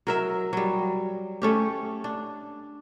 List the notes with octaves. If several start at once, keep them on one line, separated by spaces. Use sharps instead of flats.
F#3 A#4 E5
F#3 G3
A3 C#4 G4
D4